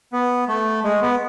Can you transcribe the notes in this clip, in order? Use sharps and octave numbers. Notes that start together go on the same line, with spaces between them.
B3
A3
G#3
B3